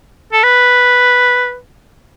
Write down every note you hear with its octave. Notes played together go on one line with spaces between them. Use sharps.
A4
B4